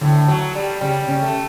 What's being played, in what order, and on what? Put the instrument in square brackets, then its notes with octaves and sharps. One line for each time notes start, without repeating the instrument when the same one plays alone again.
[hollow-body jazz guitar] D2 D3 [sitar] A2
[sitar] F#3
G3
[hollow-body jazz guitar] C#3 C#4 [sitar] G3
[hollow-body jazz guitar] C#3 C#4
[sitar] A3